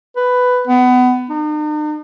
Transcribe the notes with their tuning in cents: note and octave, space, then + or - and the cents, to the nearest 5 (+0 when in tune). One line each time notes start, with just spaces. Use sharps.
B4 +10
B3 +25
D#4 -45